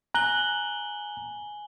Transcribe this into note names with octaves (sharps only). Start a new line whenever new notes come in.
G#5 A#5 F#6 F#7 G7